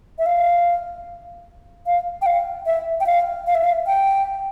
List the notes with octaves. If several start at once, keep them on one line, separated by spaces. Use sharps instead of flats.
E5
F5
F5
G5
F5
E5
G5
F5
F5
E5
F5
G5